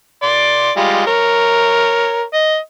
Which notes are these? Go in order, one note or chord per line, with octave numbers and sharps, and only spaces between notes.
D5 C6
G3 G#3 F4
A#4 C#5
D#5